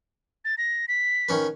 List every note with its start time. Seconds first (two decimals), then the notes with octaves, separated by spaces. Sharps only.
0.45 A6
0.58 A#6
0.88 B6
1.29 D#3 C#4 B4